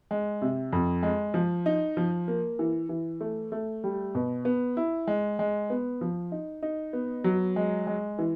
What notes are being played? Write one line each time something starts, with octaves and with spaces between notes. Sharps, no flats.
G#3
C3
F2
G#3
F3
D#4
F3
A#3
E3
E3
A3
A3
G3
B2
B3
E4
G#3
G#3
B3
F3
D#4
D#4
B3
F#3
G#3
G#3
E3